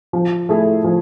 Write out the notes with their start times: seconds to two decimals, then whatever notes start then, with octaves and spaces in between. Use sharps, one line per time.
0.13 F3
0.49 A3 E4 G#4
0.84 F3